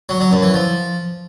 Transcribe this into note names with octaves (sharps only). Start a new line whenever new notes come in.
F#3
F#3
F#2
E3
F3